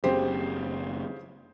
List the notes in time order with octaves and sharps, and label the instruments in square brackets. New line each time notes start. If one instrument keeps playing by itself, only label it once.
[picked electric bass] F#1 F#3 C4 [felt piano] C#3 G4 C5